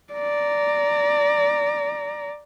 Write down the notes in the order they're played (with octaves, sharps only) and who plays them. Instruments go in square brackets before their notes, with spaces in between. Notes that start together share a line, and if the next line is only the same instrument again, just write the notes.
[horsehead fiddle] D5 A#5